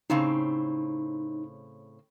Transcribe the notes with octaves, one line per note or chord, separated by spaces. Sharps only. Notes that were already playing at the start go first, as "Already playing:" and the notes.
A2 C#3 C4 D#4